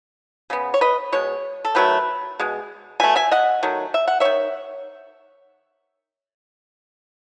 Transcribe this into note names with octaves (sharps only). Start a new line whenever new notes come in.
C#3 G#3 B3
C#5
B4 D#5
B2 G#3 C#5
A4
D#3 F#3 A3 B4
B2 G#3
B2 A3 E5 G#5
E5 G#5
D#5 F#5
D#3 F#3 A3
E5
F#5
D#3 C#5 E5